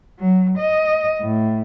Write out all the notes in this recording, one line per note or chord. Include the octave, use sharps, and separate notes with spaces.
F#3
D#5
A2